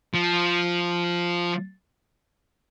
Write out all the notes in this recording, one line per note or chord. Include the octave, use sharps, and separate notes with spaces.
F3